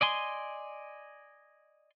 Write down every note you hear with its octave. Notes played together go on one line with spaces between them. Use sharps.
D5 D#5 G#5 C6